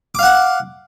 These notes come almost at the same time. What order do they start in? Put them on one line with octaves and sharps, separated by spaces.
D6 F5 F#5